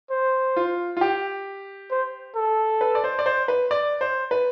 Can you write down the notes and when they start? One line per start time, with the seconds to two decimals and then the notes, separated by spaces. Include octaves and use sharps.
0.11 C5
0.56 F4
0.97 F4
1.01 G4
1.91 C5
2.36 A4
2.81 B4
2.95 D5
3.04 C5
3.19 D5
3.26 C5
3.48 B4
3.71 D5
4.01 C5
4.31 B4